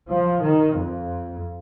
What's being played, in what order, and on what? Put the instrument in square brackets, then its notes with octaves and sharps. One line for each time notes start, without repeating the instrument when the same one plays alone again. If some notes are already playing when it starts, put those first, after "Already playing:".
[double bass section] F3
D#3
F2